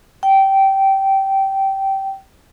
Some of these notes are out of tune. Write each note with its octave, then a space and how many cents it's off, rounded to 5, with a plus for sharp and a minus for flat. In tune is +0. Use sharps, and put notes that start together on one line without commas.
G5 -15